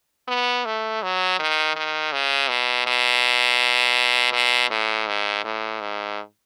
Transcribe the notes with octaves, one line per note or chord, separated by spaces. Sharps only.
B3
A3
F#3
D#3
D#3
C#3
B2
B2
B2
A2
G#2
A2
G#2